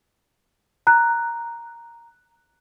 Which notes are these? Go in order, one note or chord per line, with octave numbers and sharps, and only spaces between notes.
A#5 F#6